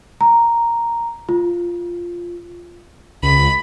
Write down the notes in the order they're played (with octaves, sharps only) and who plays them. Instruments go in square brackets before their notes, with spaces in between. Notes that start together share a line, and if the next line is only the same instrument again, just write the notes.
[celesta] A#5
F4
[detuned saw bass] C#2 [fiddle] B5